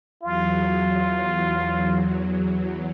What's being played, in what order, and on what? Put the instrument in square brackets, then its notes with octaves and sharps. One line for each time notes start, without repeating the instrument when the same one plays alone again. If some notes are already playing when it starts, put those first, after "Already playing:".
[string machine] E2 F#3 [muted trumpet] F4